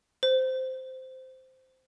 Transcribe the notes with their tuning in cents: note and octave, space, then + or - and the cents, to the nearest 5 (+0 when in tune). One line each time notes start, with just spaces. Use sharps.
C5 -10